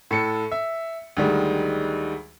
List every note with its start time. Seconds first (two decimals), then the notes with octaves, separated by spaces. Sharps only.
0.11 A2 A4 C#7
0.52 E5
1.17 D2 D#3 G3 G#3